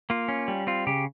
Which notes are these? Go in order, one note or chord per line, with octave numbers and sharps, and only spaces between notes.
A#3 F4
C#4
G3
C4 F4
C#3 G4